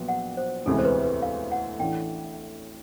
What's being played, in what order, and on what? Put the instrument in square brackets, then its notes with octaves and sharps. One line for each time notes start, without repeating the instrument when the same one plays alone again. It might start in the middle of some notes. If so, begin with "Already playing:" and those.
Already playing: [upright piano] A#1 A#2 F#3 B3
[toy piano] F#5
C5
[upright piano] E1 D2 C3 E3 G#3 [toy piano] A4
[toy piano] C5
B4
B4
F5
F#5
[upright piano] A1 A2 E3 A3 D4 [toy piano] G5